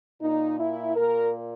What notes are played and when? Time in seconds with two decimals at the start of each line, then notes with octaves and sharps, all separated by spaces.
0.22 A#2 D#4
0.59 E4
0.95 A#2 A#4